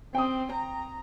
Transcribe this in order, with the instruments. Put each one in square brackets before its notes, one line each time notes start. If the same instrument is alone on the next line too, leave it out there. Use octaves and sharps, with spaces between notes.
[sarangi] C4 [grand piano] G5 D#6
[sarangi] A#5